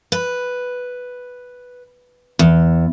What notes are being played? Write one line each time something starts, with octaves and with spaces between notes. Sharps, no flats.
B4
E2